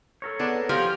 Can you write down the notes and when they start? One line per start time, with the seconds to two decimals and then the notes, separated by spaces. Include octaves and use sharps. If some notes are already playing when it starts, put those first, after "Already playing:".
0.22 A4 A#4 C#5
0.39 B3 D4 G#4
0.69 F3 G4 G#5 A#5 F6